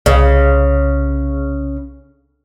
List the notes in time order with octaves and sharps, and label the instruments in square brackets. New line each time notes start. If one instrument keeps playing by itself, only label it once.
[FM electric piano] C2 [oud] C#3